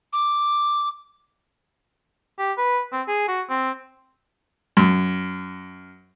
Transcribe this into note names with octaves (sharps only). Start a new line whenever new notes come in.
D6
G4
B4
C4
G#4
F#4
C4
F#2